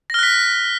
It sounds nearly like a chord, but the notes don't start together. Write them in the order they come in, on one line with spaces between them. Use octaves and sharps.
A#6 F6 F#6 B6